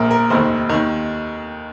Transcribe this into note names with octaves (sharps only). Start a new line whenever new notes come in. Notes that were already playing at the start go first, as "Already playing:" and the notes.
Already playing: A#1 A#2 A#4
A#4
F1 D#2 D#3 C5
D#2 D#3